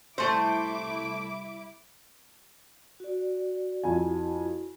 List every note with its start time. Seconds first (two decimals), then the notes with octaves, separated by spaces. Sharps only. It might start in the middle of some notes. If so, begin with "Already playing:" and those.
0.18 C2 A3 E4 C5 D6
3.00 F#4 D5
3.83 F2 E4 F#4 G#5